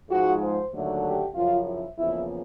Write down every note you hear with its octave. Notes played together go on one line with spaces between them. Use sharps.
G#2 F3 G#3 F#4
C5
D#2 D3 F#3 A3
G4
F#2 C#3 F3 F4
E4
E2 C#3 F3 A#3 E4